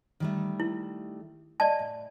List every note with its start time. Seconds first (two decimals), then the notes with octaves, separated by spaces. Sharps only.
0.20 D#3 G3 A3
0.60 E4
1.60 D5 D#5 A5
1.79 A2